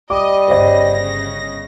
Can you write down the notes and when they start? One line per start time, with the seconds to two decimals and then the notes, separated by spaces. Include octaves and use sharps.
0.10 G3 D#5 D6
0.48 G1 C#3 C5 C#5 D#5 A#6